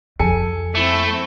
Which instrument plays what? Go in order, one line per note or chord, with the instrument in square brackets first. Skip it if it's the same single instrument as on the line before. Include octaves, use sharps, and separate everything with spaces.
[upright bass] F2 [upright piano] A4 G#5 C#7
[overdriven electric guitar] A3 [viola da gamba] C4 E4